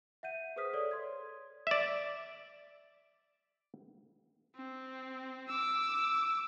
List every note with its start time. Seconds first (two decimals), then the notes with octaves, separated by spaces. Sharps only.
0.23 E5 F#5 G6 D#7
0.56 G#4 B4 C5 D#6 F6 B6
0.73 A4 C#5 D5 D#6
0.91 C6 G#6
1.67 D5 E5
4.55 C4
5.48 D6 E6